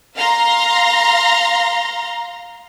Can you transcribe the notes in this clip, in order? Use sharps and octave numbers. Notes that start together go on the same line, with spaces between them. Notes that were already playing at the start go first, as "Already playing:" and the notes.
F5 A#5 C6 A#6